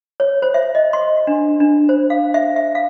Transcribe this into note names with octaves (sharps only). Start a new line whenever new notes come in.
C#5
C5
E5
D#5
C6
D4
D4
C5
F5
E5
E5
F5